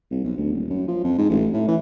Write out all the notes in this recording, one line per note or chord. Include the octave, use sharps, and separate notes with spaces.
C2
B1
D2
D#1
F#2
F3
F2
G#2
A1
A2
E3